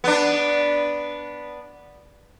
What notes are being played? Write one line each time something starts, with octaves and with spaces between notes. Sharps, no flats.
B3 D4